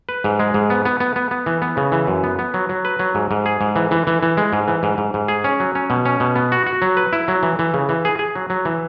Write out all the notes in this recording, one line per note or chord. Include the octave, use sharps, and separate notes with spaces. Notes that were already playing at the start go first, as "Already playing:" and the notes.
B4
G#2
G#3
G#2
B3
B3
B3
B3
B3
E3
B3
C#3
E3
F#2
B3
B3
F#3
F#3
B4
F#3
G#2
G#2
G#4
G#2
E3
E3
E3
E3
G#3
G#2
E3
G#2
G#2
G#2
G#4
C#4
F#3
C#4
B2
C#4
B2
B3
F#4
F#4
F#3
B4
E4
F#3
E3
E3
C#3
E3
G#4
G#4
F#3
F#3
E3